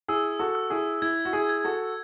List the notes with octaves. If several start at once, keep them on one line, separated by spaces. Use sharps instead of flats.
E4 G#4 E6
F#4 A4
E6
E4 G#4
E4 G#6
F#4
E4 G#4
G#6
F#4 A4